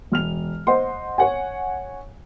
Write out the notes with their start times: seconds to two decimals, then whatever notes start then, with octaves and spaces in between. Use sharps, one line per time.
0.12 E1 F6 F7
0.67 C5 D#5 F#5 C6
1.18 C#5 F#5 G#5